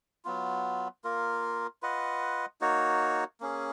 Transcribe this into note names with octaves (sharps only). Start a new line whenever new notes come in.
F#3 B3 F4
A#3 F4 A#4
F4 B4 D#5 F#5
A#3 D#4 F#4 C#5
A#3 C#4 G#4